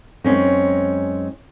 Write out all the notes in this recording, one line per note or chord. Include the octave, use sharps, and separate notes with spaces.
F#2 G#3 C4 C#4 D#4